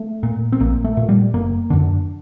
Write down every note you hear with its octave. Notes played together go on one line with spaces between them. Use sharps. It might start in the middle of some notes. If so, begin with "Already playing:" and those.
Already playing: A3
A#2
C4
A#1 A#3
A3
A#2
G3
F#1 A#3
F#2 D3 D4